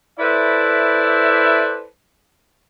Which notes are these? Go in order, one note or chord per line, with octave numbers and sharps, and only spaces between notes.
E4 A4 B4 C5 D5 E5